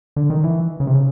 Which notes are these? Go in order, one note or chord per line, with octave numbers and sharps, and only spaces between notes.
D3
D#3
E3
C#3
C3
C#3